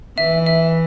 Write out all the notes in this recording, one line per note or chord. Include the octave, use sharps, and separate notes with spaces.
E3 E5
E5